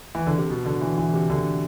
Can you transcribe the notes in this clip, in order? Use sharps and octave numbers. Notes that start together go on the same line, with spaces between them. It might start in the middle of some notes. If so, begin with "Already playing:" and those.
E3
D3
C3
B2
D3
E3
E3
C3
D3